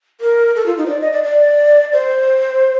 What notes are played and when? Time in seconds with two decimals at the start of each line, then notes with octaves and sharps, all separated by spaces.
0.21 A#4
0.55 A4
0.66 F4
0.78 D#4
0.86 C5
0.89 D5
1.01 D#5
1.12 D5
1.23 D5
1.93 C5